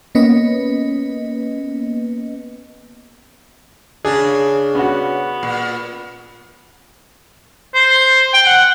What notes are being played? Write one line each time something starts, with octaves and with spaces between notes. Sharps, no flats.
A#3 B3 C#4 B4 D#5
C#3 D4 G#4
B3 C#4 F#4
A#2
C5
G5
F#5